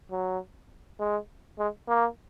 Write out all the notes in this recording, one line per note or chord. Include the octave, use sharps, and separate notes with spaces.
F#3
G#3
G#3
A#3